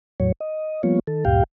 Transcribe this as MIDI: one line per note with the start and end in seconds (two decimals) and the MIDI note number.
0.20 0.32 40
0.20 0.32 45
0.20 0.32 54
0.20 0.32 73
0.40 0.82 75
0.83 0.99 53
0.83 0.99 55
0.83 0.99 58
0.83 0.99 59
0.83 0.99 65
0.83 0.99 73
1.07 1.24 51
1.07 1.24 69
1.25 1.43 38
1.25 1.43 43
1.25 1.43 46
1.25 1.43 67
1.25 1.43 77
1.25 1.43 79